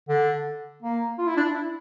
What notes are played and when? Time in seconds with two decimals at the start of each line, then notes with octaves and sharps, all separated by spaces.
0.09 D3
0.83 A#3
1.18 F4
1.27 E4
1.37 D4
1.54 E4